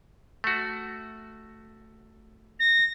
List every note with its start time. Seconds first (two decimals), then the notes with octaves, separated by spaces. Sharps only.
0.44 A3 F#4
2.60 A#6